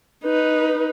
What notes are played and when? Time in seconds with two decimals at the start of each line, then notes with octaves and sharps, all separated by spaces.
0.24 D#4 B4